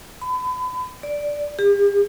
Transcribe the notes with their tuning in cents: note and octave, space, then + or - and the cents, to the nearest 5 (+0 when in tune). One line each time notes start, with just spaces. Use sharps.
B5 +35
D5 -5
G4 +45